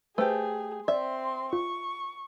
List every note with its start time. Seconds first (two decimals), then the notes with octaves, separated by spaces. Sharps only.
0.18 A3 G4 G#4 B4 C5
0.88 C4 D5 E5 C6
1.53 F4 C#6